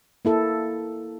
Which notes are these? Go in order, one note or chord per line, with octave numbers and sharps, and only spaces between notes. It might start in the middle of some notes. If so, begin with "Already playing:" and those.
A#3 E4 A4